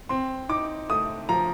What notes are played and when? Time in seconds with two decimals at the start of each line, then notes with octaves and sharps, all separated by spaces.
0.09 C4 C6
0.49 D#4 D6
0.90 A3 D#6
1.29 F3 A#5